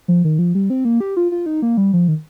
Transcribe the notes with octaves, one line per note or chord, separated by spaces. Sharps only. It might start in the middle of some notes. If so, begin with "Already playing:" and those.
F3
D#3
F3
G3
C4
A#3
G4
F4
F4
D#4
A#3
G3
F3
D#3